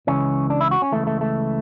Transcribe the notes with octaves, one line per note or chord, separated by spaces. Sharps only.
C#2 C#3 E3 C#4
D4
E4
F#4
C#4
C#2 C#3 E3 A3
A3
A3